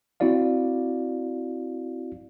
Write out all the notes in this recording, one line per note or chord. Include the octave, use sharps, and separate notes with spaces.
C4 E4 F#4 D5 F5